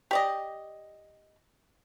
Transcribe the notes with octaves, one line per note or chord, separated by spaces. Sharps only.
G4 D5 D#5